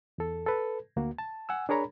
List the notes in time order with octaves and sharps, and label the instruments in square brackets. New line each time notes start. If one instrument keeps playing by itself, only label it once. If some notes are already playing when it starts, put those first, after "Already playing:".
[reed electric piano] E2 A4
A4 B4
D2 A#3 F#4
A5
F#5 G#5 E6
D4 G#4 A#4 C#5 A#5 B5